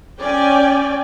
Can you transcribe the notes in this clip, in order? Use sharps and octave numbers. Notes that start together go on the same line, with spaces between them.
C#4 D5 G5 G#5